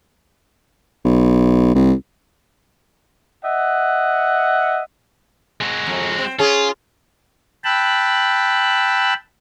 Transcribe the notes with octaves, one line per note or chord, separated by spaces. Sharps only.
B1
C2
D#5 E5 F#5
G#3 F#4
F2
C4
C#4 F4 G#4
G5 A5 B5 E6 F#6